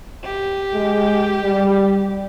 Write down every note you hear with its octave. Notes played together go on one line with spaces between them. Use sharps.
G4
G#3
G3